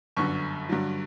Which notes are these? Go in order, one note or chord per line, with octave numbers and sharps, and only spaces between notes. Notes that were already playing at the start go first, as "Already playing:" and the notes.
G1 F#2 D3 C#6
G2 D3 F#3